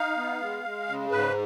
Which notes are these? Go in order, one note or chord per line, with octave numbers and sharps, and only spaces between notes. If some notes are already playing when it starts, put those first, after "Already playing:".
Already playing: D#4 F5
B3
G#3
G#3
C#3
G#2 B4